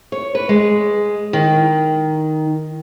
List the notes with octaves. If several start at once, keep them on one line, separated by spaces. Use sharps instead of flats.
C#5
B4
G#3
D#3